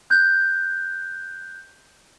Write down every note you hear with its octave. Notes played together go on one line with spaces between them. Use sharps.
F#6 G6